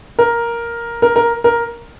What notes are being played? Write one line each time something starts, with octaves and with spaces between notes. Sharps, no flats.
A#4
A#4
A#4
A#4